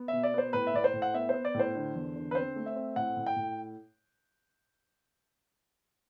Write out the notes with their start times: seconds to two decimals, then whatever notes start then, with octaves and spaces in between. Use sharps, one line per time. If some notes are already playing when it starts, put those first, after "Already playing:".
Already playing: B3
0.08 B2 E5
0.23 D5
0.34 B3 C5
0.53 A2 B4
0.67 E5
0.74 A2 D5
0.84 C5
0.93 A2
1.02 F#5
1.14 B3 E5
1.29 B3 C5
1.45 D5
1.54 A2
1.59 C5
1.75 D3
1.95 E2
2.16 D3
2.31 B4
2.35 C4 C5
2.56 A3
2.66 E5
2.76 C4
2.96 A2 F#5
3.16 A2
3.26 G5
3.36 A2